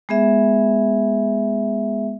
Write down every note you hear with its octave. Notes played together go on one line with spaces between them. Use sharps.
G#3 B3 G#4 E5